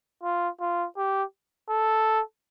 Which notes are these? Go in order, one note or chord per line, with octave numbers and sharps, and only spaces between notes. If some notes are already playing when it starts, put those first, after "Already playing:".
F4
F4
G4
A4